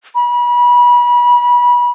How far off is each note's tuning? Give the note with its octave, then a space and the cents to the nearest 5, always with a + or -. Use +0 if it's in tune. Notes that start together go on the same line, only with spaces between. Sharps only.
B5 -30